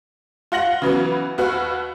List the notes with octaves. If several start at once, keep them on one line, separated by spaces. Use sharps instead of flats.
F4 F#5 A#6 F#7
C#3 E3 F#3 B3
D#2 F#4 B4